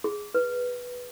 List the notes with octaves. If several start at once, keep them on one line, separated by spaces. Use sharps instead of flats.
G#4
B4